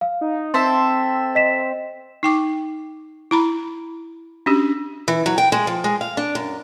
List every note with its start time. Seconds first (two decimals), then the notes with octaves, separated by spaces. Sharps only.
0.01 F5
0.21 D#4
0.54 C4 A4 C5 E5 C6
1.35 D#5 B6 E7
2.23 D#4 G5 D6
3.31 E4 A#5 B5
4.46 C#4 D4 F#4 G4
5.08 E3
5.26 F#3
5.38 G5
5.52 G#3
5.67 F3
5.84 G#3
6.01 F5
6.17 D4
6.35 F#2